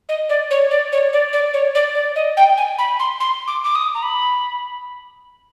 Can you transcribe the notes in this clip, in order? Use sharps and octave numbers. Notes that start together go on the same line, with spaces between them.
D#5
D5
C#5
D5
C#5
D5
D5
C#5
D5
D5
D#5
G5
G#5
B5
C6
C6
D6
D6
D#6
A#5
B5